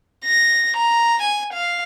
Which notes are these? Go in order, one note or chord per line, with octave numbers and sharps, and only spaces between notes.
A#6
A#5
G#5
F5